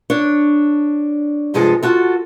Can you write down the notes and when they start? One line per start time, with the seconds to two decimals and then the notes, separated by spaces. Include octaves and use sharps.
0.10 D4 C#5
1.54 G2 C3 F3 G#3 G#4 A4
1.83 F4 F#4 A4